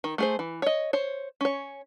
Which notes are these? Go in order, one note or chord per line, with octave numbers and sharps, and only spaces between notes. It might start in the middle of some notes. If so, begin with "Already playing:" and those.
D#3
A3 G#4 C5
E3
C#5 D#5
C5 C#5
C#4 C#5